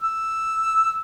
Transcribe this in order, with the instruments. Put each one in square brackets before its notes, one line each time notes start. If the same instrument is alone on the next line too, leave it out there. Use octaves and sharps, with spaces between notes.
[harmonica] E6